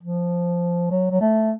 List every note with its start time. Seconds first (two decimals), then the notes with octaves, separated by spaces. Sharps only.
0.03 F3
0.91 F#3
1.11 F#3
1.21 A3